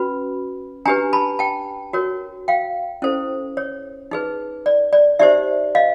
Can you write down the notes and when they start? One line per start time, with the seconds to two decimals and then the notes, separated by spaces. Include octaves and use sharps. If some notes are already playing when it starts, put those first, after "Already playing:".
Already playing: C#4 F#4 B4 B5
0.85 D4 G4 B4 G#5 A#5
1.13 A5 B5
1.39 G5 A5
1.93 F#4 A#4 C#5
2.48 F5 G5
3.02 C#4 E4 A4 C5
3.57 C#5
4.11 D#4 G#4 B4
4.66 D5
4.93 D5
5.19 D#4 G4 C5 D5 E5
5.75 D#5 F5